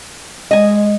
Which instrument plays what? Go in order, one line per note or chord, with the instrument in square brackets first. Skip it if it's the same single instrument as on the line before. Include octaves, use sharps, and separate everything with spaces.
[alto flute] G#3 [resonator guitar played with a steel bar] D#5 G#5